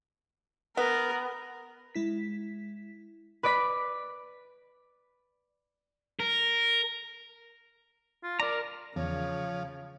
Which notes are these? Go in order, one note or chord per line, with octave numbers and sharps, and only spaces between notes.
B3 A#4
G#3 E4 B6
B4 D5 D6 B6
A#4
F4
A#4 D5 A#5
E2 C#3 F3 C#5